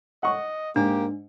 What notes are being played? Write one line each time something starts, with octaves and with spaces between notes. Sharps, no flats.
D#5 F#5 C#6
G#2 A#3 D4 G4